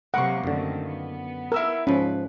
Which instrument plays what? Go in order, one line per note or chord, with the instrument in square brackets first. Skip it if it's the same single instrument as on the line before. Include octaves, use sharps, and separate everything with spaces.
[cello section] C3 F#3 [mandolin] A#3 C#6 [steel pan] F#5
[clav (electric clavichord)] F#2 D3 [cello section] D#3 A3 C4
[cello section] B3
[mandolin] E4 E5 F6 [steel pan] A#4
[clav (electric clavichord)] G#2 F3 [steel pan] C#4 [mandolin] B4